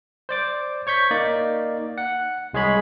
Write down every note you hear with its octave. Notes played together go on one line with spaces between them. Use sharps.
C5 D5 D6
C#5 C#6 G6 B6
A#3 D#4 D5
F#5
C2 G#3 G#4 C#5 B5